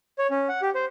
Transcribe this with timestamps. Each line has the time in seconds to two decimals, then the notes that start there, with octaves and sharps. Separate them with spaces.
0.19 C#5
0.31 C#4
0.49 F#5
0.62 G4
0.75 C5